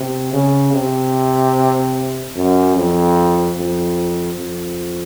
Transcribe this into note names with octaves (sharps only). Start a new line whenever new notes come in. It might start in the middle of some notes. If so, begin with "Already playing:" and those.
Already playing: C3
C#3
C3
F#2
F2
F2
F2